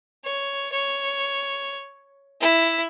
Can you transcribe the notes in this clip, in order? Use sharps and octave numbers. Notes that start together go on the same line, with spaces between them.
C#5
C#5
E4